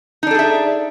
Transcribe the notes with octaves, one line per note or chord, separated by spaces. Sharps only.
D4 D#4 G#4 A4 E5